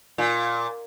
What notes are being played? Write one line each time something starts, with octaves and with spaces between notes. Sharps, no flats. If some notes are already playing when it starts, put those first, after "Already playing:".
A#2